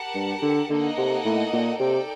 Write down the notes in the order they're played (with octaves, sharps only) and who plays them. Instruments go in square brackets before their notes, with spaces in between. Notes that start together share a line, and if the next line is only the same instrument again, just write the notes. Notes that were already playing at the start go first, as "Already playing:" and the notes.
Already playing: [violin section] G4 A#4 F#5 A5
[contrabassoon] G2
D3
[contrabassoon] D3 [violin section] A#3 D#4 A4 D#5 F#5
[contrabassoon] C3
A2
A#2
[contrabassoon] C3 [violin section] D#4 A4 D5 G5